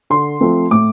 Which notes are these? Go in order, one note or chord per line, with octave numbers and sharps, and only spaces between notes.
D3 C6
F3 A3 C4
A2 D6